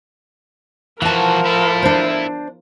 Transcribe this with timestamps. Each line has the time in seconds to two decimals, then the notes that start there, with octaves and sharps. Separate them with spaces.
1.02 E3 F3 F#4 A#4 F#5 A5
1.45 E4 A4
1.83 D4 C5